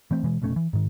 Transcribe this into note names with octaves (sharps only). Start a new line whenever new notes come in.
E3 A3 C4
B2 E3 G#3
F1 B2 A3 C#4
E3
G#2 D#3